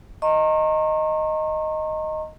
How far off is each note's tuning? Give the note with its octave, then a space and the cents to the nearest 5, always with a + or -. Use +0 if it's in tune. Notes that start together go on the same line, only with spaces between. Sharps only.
D#5 +0 A#5 -25 C#6 -40